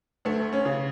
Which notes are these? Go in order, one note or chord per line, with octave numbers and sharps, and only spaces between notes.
D2 A3
C#4
C#3